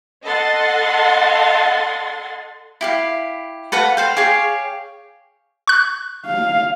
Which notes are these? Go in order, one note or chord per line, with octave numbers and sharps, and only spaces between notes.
A4 D#5 F#5 C6 A6
E4 G4 F5
A4 B4 F5 F#5
C5 F5 G5
G4 G#4 C#5 F5
C#6 F#6
F5